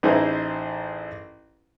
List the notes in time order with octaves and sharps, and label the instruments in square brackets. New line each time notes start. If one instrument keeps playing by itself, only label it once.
[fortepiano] A1 D#4 E4 G#4 B4 C5